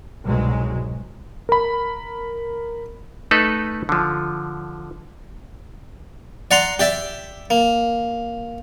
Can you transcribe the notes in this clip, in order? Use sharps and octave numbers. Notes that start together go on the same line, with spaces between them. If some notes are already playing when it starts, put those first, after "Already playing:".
C2 G#2 B2 F#3 G#3
A#4 B5
A3 D#4 A4 B4
D3 F3
D5 F#5 A#5 C6
G4 D5 E5
A#3